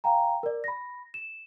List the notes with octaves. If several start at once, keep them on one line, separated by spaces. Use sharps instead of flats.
F5 G5 G#5 A#5
A#4 D5
B5 A#6
E7